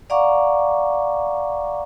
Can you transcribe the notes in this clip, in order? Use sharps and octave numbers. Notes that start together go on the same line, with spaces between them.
D5 F5 F#5 A#5 C#6 D6